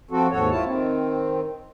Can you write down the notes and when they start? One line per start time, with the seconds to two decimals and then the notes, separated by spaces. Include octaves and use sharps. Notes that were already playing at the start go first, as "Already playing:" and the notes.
0.11 F3 C4 F#4 A4
0.31 D#2 G#2 F#4 A4 C#5
0.51 E4 F4 A5
0.65 D#3 C4